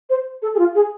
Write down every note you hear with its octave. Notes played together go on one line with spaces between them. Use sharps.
C5
A4
G#4
F4
G#4